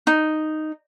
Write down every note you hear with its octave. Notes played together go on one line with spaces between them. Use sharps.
D#4